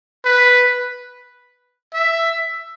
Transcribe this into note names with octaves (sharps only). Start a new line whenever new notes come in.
B4
E5